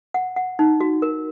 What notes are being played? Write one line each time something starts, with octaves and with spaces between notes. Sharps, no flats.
F#5
F#5
D#4
F#4
A#4